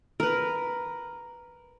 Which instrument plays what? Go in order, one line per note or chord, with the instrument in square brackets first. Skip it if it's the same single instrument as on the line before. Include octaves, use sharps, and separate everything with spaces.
[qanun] A#4 B4